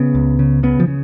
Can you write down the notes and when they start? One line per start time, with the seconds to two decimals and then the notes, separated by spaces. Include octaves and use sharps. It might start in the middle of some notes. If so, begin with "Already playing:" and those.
Already playing: C#3 B3
0.15 C#2
0.39 C#3
0.63 C#3 B3
0.80 F3
0.88 C#3